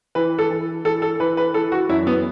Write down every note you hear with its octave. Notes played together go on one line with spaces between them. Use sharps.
E3 B4
A4
E3
E3 A4
A4
E3 B4
B4
E3 A4
F#4
F#2 E4
B3